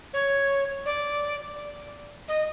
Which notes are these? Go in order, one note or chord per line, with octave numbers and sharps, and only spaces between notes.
C#5
D5
D#5